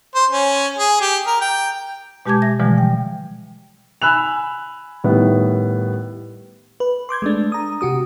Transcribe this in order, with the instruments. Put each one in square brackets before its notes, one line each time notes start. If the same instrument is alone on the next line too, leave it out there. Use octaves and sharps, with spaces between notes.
[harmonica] C5
C#4
G#4
G4
A#4
G5
[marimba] B2 G#3 G4 A5 D6 G#6
E5 A#6
B2 D3 E3 F3 G3 G#3
G5
[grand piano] G#5 B5 E6 F#6 F7
A2 D#3 G3 B3
[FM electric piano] B4
C6 D6 G6 G#6
G#3 A3 D4
A#5 D#6
C3 F#4 G4 D#6